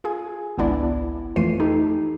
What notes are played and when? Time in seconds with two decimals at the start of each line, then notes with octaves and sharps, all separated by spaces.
0.04 F4 G#4 G#5
0.57 G#1 C#2 B3 D4 E4 D5
1.36 F2 E3 A3 F4 C7 D#7
1.60 D#4 G4 A4